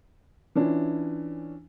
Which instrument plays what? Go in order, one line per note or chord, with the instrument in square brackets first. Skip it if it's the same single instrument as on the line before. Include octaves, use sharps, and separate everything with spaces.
[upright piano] E3 C#4 D4 E4 F4